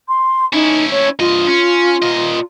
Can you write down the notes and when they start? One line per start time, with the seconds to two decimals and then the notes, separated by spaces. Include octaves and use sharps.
0.08 C6
0.53 C#4 D#4 E4
0.91 C#5
1.19 G2 F4 D#5
1.48 C#4
2.03 A#2 D#5